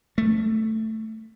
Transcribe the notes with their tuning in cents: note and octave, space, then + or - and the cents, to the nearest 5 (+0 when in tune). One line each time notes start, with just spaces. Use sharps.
A3 +5